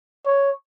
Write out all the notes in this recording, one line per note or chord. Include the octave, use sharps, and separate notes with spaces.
C#5